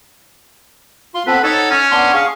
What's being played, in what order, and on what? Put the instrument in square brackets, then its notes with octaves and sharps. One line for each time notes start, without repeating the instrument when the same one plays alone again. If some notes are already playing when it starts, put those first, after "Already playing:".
[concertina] F4 C6
[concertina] B3 C4 A4 [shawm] B4
[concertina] D#4 C#5 F#5 [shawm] A4
[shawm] C#4 [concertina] G#5
[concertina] B3 D4 C6
G#4 F5 C#6